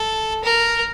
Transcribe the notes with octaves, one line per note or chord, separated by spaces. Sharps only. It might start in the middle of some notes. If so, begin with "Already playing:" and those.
Already playing: A4
A#4